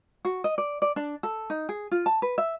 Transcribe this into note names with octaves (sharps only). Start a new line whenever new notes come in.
F#4
D#5
D5
D5
D4
A4
D#4
G#4
F4
A5
B4
E5